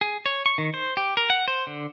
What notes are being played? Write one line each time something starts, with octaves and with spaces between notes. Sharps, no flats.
G#4
C#5
C#6
D#3
C5
G4
A#4
F#5
C5
D3